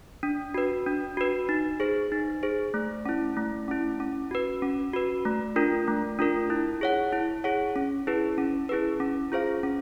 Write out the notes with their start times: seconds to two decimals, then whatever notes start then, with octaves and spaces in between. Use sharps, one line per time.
0.23 D4
0.54 F#4 B4
0.86 D4
1.17 F#4 B4
1.49 D#4
1.80 G#4 C5
2.12 D#4
2.43 G#4 C5
2.74 A3
3.05 C#4 E4
3.37 A3
3.68 C#4 E4
4.00 C#4
4.31 F#4 B4
4.62 C#4
4.93 F#4 B4
5.25 A3
5.56 D4 F4 A#4
5.88 A3
6.19 D4 F4 A#4
6.50 E4
6.81 G#4 C#5 F#5
7.13 E4
7.44 G#4 C#5 F#5
7.76 C#4
8.07 E4 G#4 B4
8.38 C#4
8.69 E4 G#4 B4
9.00 C#4
9.32 F4 G#4 C5 F5
9.63 C#4